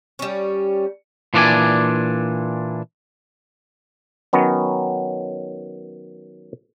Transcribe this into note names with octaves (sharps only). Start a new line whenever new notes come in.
G3 C#4
A#2 E3 D4 A#4 D5 G#5
D#3 F#3 B3 C#4